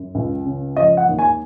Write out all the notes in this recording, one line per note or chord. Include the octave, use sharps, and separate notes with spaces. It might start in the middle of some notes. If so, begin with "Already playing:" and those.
Already playing: F#2
C#2
C#3
F3 D#5
F#5
D#2
G#5